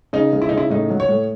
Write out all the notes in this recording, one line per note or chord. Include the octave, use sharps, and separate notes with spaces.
C#3 D#4
C#3
E4
C#3 D#4
E4
A2 D#4
F#3
C#5
A2